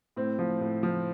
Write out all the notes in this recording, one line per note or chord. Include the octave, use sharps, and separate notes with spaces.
A2 C4
F3
A2
F3